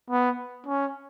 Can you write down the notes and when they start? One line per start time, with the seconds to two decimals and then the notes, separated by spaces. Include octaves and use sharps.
0.10 B3
0.67 C#4